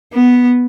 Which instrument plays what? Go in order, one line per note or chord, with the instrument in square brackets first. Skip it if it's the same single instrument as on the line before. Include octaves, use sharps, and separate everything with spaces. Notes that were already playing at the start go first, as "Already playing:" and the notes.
[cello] B3